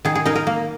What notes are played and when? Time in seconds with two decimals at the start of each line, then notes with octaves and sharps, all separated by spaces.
0.05 D#3 G#4
0.15 G#4
0.26 D#4 A#4
0.36 A#4
0.47 A#3